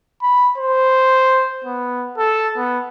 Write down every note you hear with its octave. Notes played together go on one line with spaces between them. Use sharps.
B5
C5
B3
A4
B3